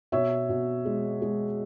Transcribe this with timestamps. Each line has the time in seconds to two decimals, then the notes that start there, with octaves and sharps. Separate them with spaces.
0.12 B2 C#5 E5
0.49 B2
0.85 G#3
1.22 G#3